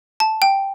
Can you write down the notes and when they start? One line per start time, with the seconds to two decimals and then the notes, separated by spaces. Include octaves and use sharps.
0.20 A5
0.42 G5